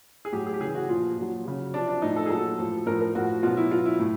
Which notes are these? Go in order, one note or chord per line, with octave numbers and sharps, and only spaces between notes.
G#4
A2 F#3 G4
G#4
G4
C#3 E3 G#4
F#4
A#2 F3 F4
A#2 F#3
C#3 F#3
C3 F3 D4
D4
A2 F3 D#4
A4
G#4
A#2 F#3 A4
A2 F3
A2 F3 A#4
A#4
A2 F3 F#4
B2 F#3 F4
E4
B2 F#3 F4
E4
A2